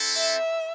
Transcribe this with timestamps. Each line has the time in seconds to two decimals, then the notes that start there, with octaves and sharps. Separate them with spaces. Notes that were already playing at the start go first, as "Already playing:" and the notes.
Already playing: C4 E4 A4
0.17 E5